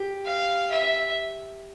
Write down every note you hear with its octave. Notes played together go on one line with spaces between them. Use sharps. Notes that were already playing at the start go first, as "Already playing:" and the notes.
Already playing: G4
F5
E5